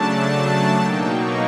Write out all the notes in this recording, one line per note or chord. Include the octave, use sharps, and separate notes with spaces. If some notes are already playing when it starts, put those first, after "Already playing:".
Already playing: C#3 F#3 A3 D4 A5
B2 F#3 A#3 D#4 G5
C#6